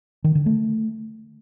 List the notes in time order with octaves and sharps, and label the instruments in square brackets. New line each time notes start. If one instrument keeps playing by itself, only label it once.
[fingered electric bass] D#3
D3
A3